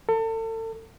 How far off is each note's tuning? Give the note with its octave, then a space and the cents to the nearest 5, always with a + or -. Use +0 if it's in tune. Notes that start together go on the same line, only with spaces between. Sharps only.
A4 +35